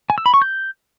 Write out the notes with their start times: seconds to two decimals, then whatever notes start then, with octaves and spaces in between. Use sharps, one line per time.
0.10 G#5
0.18 E6
0.26 B5
0.34 C#6
0.42 G6